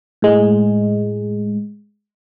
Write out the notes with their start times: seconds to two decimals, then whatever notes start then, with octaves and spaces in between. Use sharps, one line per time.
0.22 A2 G#3